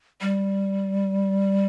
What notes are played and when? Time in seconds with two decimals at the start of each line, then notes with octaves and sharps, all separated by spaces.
0.21 G3